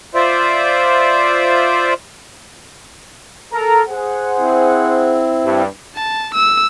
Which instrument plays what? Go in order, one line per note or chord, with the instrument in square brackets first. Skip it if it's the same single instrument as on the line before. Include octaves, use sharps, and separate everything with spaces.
[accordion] F4 C5 D5 E5
[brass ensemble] A4 A#4 A#5
G#4 C5 F#5
[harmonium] C4 E4
[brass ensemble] G2
[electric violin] A5
E6